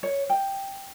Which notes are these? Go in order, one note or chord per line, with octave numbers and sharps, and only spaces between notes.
C#5
G5